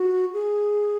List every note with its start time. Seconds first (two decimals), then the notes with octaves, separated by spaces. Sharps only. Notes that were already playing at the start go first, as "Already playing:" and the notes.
Already playing: F#4
0.33 G#4